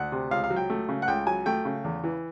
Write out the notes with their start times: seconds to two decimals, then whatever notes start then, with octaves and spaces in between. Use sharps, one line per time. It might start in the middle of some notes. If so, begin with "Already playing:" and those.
Already playing: D2 F#5
0.12 C3
0.31 C#2 F5
0.44 F5
0.50 F#3
0.57 G5
0.70 A3
0.89 C#3
1.02 F#5
1.08 C#2 G5
1.27 F#3 G#5
1.46 A3 G5
1.65 C#3
1.84 E2
2.04 E3